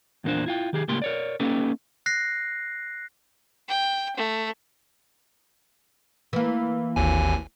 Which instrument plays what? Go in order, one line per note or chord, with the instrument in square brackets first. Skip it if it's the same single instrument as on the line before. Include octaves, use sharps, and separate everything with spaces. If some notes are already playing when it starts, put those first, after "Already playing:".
[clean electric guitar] E2 A#2 A#3 D4 C5
E4 F4 G5
D#3 G4 G#4
C#2 A2 A#3 G4 C6
A#4 C#5 D5
A#3 C#4 D#4 G4 A4 B4
[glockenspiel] F#6 A#6 C7
[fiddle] G5
A3
[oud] E3 A#3
[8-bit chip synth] G#1 D#2 G#5